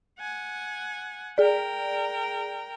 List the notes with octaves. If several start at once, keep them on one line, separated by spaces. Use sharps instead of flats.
F#5 G#5
G#4 A#4 D5 G5